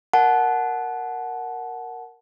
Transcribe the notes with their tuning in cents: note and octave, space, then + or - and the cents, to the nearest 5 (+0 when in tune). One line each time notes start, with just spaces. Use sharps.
A#4 +0 F#5 +0 A5 -25